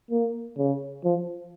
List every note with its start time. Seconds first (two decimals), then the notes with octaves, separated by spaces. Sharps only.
0.11 A#3
0.57 C#3
1.04 F3